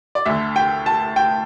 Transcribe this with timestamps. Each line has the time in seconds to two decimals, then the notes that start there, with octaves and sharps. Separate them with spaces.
0.15 D5
0.25 D2 D3 E5
0.56 G5
0.86 A5
1.16 G5